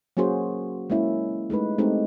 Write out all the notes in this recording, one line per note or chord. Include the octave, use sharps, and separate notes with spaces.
F#3 A#3 C#4 F#4 G#4 C5
G#3 A#3 C#4 E4
G#3 A3 D#4 B4
G#3 A3 C4 D#4 G4